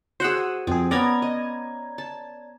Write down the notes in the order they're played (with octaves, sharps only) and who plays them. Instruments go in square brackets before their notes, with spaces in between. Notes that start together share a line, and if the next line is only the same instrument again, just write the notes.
[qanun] F#4 G#4 [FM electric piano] C5 F#5 E6
[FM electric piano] F2 G#4 [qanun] C4
[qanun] B3 C#4 [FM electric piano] D5 A#5 G#6
[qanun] D#5
A5